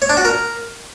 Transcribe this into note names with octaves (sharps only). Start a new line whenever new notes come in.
C#5
D4
F#4
A#4